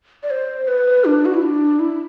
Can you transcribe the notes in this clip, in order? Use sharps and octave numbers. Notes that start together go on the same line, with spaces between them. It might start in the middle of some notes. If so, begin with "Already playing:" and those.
D5
C5
B4
D4
F#4
E4
D4
E4